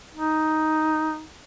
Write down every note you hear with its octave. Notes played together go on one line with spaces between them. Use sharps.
D#4